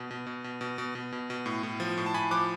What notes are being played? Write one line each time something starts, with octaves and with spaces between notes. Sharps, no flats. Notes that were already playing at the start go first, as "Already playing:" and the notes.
Already playing: B2
B2
B2
B2
B2
B2
B2
B2
B2
A2
A2
F3
A2
A5
A2 G#5 B5
F3 D6 F#6